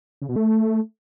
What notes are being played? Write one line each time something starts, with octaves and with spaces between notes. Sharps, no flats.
C#3
B2
A3